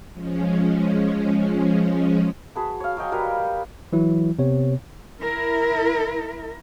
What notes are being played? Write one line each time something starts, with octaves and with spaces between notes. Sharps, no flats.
F3 G#3 C#4
F#4 G#4 B4 A5
C#5 F5
F#3 D#5 G5 G#5
G3 A#4 B4 F5
E3 F#3 E4
C3 B3 C#5
E4 A#4